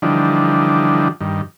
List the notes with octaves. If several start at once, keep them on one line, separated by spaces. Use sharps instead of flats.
D3 E3 F3 G3 D4 D#4
G2 D#3